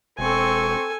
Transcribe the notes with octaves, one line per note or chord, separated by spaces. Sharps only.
E1 C4 A4 G#5 C#6